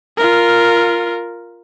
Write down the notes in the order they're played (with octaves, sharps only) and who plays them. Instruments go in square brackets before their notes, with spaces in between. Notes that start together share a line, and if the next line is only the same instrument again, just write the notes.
[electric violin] F4 A#4